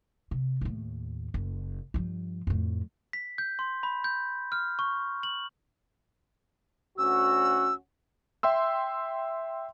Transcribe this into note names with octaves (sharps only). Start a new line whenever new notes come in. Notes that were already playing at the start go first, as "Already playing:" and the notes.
C3
D#2 A2
F#1
G2 F3
F2 A2
B6
G6
C6
B5
G6
F6
C#6
F#7
D2 C#4 F#4 E6
E5 G5 C6 E6